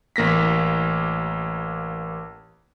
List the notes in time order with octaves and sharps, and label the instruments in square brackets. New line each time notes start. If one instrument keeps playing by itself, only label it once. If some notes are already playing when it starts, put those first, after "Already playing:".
[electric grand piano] A1 A#3 A#6 B6